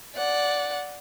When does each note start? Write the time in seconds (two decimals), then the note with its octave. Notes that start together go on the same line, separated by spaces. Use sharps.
0.15 D5 F#5